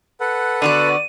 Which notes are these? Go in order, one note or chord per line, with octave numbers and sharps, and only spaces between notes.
A4 B4 F#5
D3 B3 F#4 D5 D#7